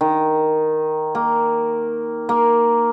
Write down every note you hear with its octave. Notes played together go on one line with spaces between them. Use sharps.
D#3
A#3
A#3